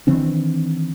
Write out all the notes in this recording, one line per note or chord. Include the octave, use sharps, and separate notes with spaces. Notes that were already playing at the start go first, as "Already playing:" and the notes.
D#3 E3 C4 D4